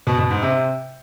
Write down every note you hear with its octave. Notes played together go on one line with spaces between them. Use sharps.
B2
B2
G#2
C3